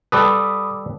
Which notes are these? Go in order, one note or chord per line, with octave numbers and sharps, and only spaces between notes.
G3 A4 B4 B5 D6 D#6